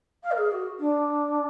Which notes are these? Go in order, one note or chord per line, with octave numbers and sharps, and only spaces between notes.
F5
A#4
G#4
F#4
D4